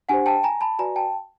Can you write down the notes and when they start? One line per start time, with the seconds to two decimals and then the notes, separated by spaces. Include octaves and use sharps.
0.09 D4 G4 C5 F#5 G#5
0.26 G5 A5
0.43 G#5 A#5
0.61 A5 B5
0.79 F#4 B4 D5 G#5 A#5
0.96 G5 A5